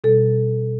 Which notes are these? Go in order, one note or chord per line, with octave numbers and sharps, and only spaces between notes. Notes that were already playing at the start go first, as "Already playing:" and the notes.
B2 G3 A4